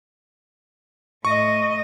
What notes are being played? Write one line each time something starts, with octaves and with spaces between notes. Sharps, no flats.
A2 D#5 C#6